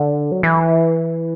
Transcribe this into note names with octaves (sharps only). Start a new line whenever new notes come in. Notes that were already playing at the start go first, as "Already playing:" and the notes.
Already playing: D3
F#3
E3